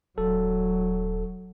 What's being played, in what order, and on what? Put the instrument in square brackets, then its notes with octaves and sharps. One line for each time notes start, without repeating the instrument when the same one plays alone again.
[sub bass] D#1 [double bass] F#3 [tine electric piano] A4